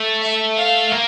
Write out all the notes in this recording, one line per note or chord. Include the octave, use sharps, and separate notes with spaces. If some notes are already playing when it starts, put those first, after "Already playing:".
Already playing: A3
E5
F5
A#3